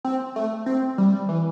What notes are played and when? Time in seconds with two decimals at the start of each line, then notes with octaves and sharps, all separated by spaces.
0.04 C4
0.36 A3
0.66 C4
0.98 G3
1.29 E3